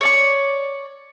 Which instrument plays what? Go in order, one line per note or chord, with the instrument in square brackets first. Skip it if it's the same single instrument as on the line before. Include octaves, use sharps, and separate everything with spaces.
[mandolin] C#5 D5 C#6